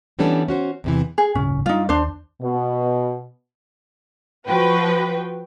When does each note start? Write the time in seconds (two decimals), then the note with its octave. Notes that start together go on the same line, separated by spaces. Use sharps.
0.19 E3 G3 B3 C#4 D4 A4
0.48 C#4 F#4 C5
0.84 E2 C3 E3
1.18 G#4
1.35 D1 G1 C#3 C#4
1.66 G3 D4 D#4 F4
1.89 D#2 D4 C5
2.41 B2
4.47 F3 F#4 B4 G5